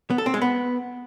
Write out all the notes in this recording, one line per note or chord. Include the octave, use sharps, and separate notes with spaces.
B3
A4
C4
G#3
B3